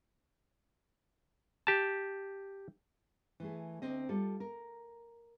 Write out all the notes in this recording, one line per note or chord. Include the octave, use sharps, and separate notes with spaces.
G4 A5
E3 A3 G#4
D2 C4 D#5
G3 F4 A4
A#4